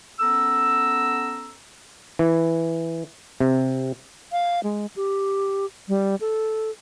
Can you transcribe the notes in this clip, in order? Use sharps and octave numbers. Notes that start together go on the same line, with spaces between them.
B3 C#4 A4 A#5 E6
E3
C3
F5
G#3
G4
G3
A4